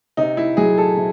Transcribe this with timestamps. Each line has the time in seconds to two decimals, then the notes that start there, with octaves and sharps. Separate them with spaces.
0.17 C3 D#4
0.37 E4
0.57 F#3 G#4
0.78 A4
0.97 C3